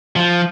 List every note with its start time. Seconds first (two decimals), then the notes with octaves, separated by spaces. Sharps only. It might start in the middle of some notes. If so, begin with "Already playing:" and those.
0.16 F3